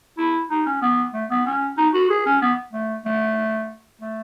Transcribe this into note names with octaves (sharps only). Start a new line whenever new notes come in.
E4
D#4
C#4
B3
A3
B3
C#4
D#4
F#4
G#4
C#4
B3
A3
A3
A3